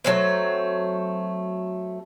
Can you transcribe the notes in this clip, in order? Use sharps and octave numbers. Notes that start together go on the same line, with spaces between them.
F#3 A3 C4